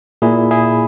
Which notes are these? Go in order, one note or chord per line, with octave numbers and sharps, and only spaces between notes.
A#2 E4 G#4
E4 G#4